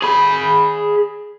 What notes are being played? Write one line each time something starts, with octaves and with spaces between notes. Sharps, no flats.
G#4 B5